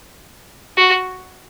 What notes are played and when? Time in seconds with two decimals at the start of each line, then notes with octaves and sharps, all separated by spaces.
0.77 F#4